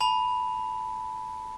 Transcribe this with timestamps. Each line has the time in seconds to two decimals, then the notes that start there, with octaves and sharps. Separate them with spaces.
0.01 A5 B5